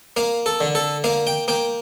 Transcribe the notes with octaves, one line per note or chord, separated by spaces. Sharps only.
A#3 F5
A4
D3
A4
A#3 F5
G5
A#3 G5